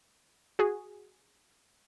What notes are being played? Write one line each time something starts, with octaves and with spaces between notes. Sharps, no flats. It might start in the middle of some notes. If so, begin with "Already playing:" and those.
F#4 G#4